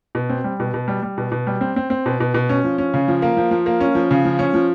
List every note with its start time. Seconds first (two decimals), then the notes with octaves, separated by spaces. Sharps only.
0.15 B2
0.29 C4
0.44 G3
0.60 B2
0.74 B2
0.88 G3
1.03 G3
1.18 B2
1.32 B2
1.47 G3
1.61 C4
1.76 C4
1.90 C4
2.06 B2
2.20 B2
2.34 B2
2.49 C#4
2.64 F3
2.78 C#4
2.94 C#3
3.08 F3
3.22 A#3
3.37 F3
3.51 F3
3.66 A#3
3.81 C#4
3.95 F3
4.11 C#3
4.25 F3
4.39 C#4
4.54 F3